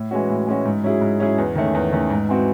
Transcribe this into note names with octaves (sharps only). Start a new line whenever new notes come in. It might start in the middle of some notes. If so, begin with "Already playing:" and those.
Already playing: A2
E3 G#3 C#4 F#4
A2
E3 G#3 C#4 F#4
G#2
F#3 C#4 E4 G#4
G#2
F#3 C#4 E4 G#4
E2
D#3 A3 C#4
E2
D#3 A3 C#4
G#2
E3 C4 F#4